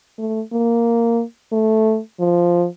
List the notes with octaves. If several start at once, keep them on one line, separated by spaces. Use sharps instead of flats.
A3
A#3
A3
F3